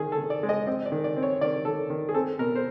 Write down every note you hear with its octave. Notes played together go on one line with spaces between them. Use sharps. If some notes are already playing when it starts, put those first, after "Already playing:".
Already playing: D#3 C#4 G#4
A4
D#3
D5
G#3
D#5
C4 D#5
D5
D#3
D5
C4
C#5
D#3 D5
D#3 A4
D#3
G#4
C4 A4
B2 A#4
C5